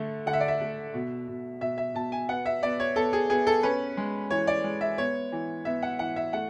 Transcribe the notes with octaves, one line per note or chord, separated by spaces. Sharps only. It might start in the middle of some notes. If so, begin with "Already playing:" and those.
Already playing: D3 A3
D3 F#5
E5
D5
E5
A3
B2
B2
B2 E5
E5
B2 A5
G#5
B3 F#5
E5
B3 D5
C#5
B3 A4
G#4
B3 G#4
A4
C#4 B4
G#3
E3 C#5
D5
G#3
E5
B3 C#5
E3
B3 E5
F#5
E3 F#5
E5
A3 F#5